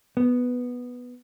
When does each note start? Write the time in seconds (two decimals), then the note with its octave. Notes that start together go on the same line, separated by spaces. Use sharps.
0.17 B3